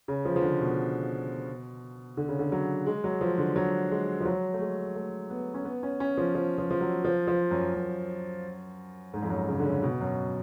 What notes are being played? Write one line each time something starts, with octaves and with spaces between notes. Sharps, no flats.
C#3
F3
F3
D3
B2
D3
C#3
D3
F#3
G#3
F#3
F3
D3
F#3
G#3
F3
F#3
A3
G#3
A3
B3
C#4
B3
C#4
C#4
F3
F3
F3
F3
F#3
F3
F3
F#2
F#2
G#2
F2
F#2
C#3
D3
C#3
B2
F#2